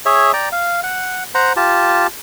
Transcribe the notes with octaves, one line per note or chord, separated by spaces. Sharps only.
G#4 C#5 E5
D5 G5 A#5
F5
F#5
C5 F#5 A#5
F4 G4 A5